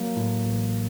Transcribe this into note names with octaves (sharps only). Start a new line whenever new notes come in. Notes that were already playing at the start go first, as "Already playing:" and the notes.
Already playing: F#3 A#3
A2
A1